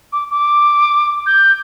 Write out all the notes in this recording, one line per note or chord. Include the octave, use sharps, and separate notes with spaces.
D6
D6
G6